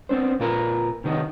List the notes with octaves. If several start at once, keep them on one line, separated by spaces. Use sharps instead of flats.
B3 C4 D4 C5
A#2 F4 A#4 B4
C3 D#3 B3 D#4